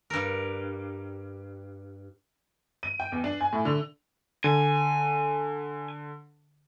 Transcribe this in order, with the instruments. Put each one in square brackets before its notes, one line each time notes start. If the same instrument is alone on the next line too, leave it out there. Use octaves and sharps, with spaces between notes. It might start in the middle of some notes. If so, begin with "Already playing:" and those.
[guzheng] G2 A#4
[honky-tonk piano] D#7
G5
E2
D4
G#5
A2
D3
[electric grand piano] D3 [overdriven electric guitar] G#5